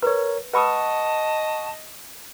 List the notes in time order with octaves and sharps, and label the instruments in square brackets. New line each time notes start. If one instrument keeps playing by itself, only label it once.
[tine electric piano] A#4 C#5 [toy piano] B4
[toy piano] B4 B5 E6 [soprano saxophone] D#5 [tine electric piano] F#5 C#6 D#6 [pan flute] A5